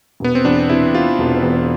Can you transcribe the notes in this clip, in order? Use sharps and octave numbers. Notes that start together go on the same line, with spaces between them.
E1 B3
C4
E2 D4
C3 E4
C3 F4
E1
E2